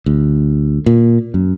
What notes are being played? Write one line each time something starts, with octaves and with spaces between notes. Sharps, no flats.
D2
A#2
F#2